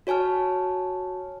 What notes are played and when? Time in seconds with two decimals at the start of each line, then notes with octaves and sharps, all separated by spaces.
0.07 F#4 C#5 G#5 A5 F6